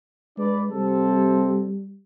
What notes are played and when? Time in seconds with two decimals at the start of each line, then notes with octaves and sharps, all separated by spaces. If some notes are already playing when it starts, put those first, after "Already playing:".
0.38 G#3 D4 B4 D5
0.72 C3 G3 C4 A4